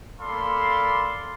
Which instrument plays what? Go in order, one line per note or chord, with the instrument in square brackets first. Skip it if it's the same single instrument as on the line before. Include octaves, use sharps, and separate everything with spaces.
[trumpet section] A#3 A4 D5 F5 B5 C6